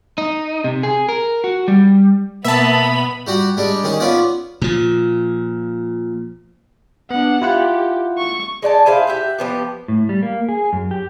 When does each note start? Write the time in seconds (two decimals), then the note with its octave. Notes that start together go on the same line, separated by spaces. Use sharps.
0.18 D#4
0.64 C3
0.83 G#4
1.09 A#4
1.44 F#4
1.68 G3
2.45 B2 A#3 B3 E5 A5 B5
3.27 G3 F#4 F#5
3.57 G3 G#3 D4
3.84 D#3 C#4 G#4
4.00 B3 C#4 F4 D5 F#5
4.62 A#2 F3
7.11 B3 D4 F#5
7.42 E4 F4 G4 F#5
8.18 C#6
8.62 G#3 D5 F#5 A5
8.86 E4 G#4 C5 F5
9.07 G4 E5 F#5
9.39 F3 B3 G4
9.88 A2
10.09 G3
10.22 A#3
10.49 G#4
10.73 F#2
10.91 G4